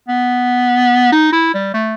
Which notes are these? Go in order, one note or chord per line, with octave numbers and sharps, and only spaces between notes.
B3
D#4
E4
G3
A3